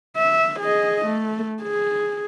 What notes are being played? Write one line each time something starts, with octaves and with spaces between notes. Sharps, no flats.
E5
G#4 D#5
A3
G#4